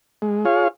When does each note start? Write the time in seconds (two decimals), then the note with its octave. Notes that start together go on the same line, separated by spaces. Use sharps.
0.22 G#3
0.45 F4 G#4 C#5 F5